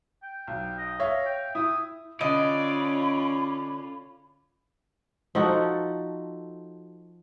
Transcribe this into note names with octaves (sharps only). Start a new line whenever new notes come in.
G5
B1
D#5
C#5 E5 F5
G5
E4 D#6
D3 C#4 F4 D5 D#5 B5
F3 D#4 F#4 A4